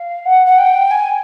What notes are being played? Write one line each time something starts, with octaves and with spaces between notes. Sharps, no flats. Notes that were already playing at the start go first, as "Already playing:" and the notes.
Already playing: F5
F#5
F#5
G5
G#5